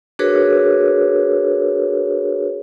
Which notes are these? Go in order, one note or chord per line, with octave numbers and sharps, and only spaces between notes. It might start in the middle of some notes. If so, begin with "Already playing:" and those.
D4 F#4 G#4 A#4 B4 C#5